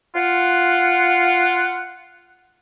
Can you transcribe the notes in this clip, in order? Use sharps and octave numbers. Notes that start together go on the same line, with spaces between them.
F4 F#5